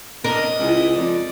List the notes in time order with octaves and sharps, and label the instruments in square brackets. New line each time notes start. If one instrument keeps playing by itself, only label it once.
[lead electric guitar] C#4 D4 [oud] A#4 [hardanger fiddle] D#5 D#6
[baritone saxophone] C#2 [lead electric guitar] E4
[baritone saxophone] F2 [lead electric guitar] D5